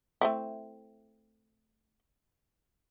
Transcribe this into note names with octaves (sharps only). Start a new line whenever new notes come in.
A3 C4 E4